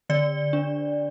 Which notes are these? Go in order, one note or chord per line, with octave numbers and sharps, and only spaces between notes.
D3 D5
D4